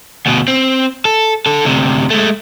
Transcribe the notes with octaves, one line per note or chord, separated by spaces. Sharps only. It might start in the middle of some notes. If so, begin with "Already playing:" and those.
D2 B2
C4
A4
D3 A4
D2 C3
G#3 A3